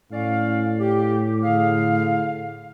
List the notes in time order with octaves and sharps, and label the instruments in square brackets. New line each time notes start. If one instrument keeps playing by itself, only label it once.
[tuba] A2 [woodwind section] C#4 D5 F5
[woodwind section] G4
D3 G#4 F5